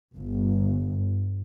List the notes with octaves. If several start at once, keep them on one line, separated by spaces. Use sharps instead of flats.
G1